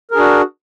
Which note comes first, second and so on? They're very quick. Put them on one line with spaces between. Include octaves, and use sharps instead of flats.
A#4 G#4 D4 F#4